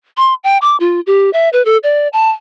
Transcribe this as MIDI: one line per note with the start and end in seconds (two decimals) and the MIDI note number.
0.17 0.34 84
0.44 0.58 79
0.62 0.76 86
0.80 1.00 65
1.07 1.30 67
1.33 1.49 76
1.53 1.64 71
1.65 1.77 69
1.83 2.08 74
2.13 2.29 81